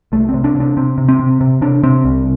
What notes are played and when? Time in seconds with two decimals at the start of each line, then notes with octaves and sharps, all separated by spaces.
0.12 C2 A3
0.29 C4
0.34 C3
0.44 D4
0.55 C3
0.60 D4
0.77 C3 C4
0.98 C3
1.08 C4
1.19 C3
1.41 C3
1.61 C3 D4
1.83 C3 C4
2.04 C2